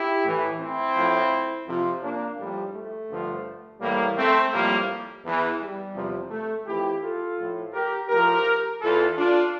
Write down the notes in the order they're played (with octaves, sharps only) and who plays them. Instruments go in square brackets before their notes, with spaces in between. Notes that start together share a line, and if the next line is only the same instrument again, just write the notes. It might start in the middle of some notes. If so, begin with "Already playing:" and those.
Already playing: [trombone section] E4 G4
A2 E3
C4 E4
A2 F3
F2 C3 F3
A#3 D4
A2 F3 G3
A3
G2 D3 F3
A2 E3 G3 A#3
A3 C4
A2 F3 G3 A#3
E2 E3
G3
E2 C3 F3
A3
F2 E3 E4 G4
F4 A4
A2 F3
G4 A#4
A2 F3 G4 A#4
E2 E3 F4 A4
D4 F4